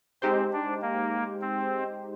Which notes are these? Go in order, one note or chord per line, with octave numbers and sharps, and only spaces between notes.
G#3 C4 D#4 G4 C5
D4
A#3
C4